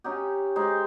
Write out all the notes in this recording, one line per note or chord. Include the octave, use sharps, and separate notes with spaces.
C#4 D#4 G4
G#3 D#4 G4 C5